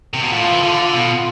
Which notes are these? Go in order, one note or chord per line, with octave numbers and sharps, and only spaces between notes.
C3
B2
A2 F4
F3
E3
D3
B2 F4